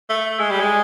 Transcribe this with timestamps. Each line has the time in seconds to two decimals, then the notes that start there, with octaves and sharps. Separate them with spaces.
0.10 A3
0.39 G#3
0.50 G3
0.60 G#3